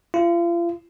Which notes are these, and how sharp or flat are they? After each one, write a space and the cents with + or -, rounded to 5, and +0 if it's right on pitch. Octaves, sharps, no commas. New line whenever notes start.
F4 -35